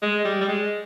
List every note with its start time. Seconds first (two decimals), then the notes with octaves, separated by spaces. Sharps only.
0.02 G#3
0.25 G3
0.41 G3
0.48 G#3